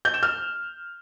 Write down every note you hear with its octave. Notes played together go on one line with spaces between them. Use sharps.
G6
E7
F6